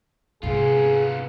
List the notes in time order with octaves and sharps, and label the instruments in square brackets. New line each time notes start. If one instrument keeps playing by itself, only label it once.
[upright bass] G#1 C3 [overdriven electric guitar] B3 F4 [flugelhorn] G#4